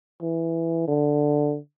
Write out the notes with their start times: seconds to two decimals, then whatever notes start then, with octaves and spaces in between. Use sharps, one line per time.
0.22 E3
0.88 D3